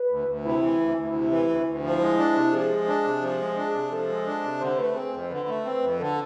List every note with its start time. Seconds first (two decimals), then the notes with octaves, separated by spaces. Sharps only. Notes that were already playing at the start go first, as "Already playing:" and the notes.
Already playing: B4
0.10 D2
0.28 D2
0.45 C3 E4
0.62 E3
0.80 D2
0.97 D2
1.14 C3
1.31 E3
1.49 D2
1.66 D2
1.83 F3 E4
2.01 G#3
2.18 D4
2.36 C3
2.53 F3 G#4
2.70 G#3
2.88 D4
3.05 C3
3.22 F3
3.40 G#3
3.57 D4
3.74 C3
3.91 F3 A4
4.09 G#3
4.26 D4
4.44 C3
4.61 D3 C5
4.78 A3 B4
4.96 C4 G#4
5.13 F2 C5
5.30 D3 B4
5.48 A3
5.65 C4
5.82 F2
6.00 D3 A4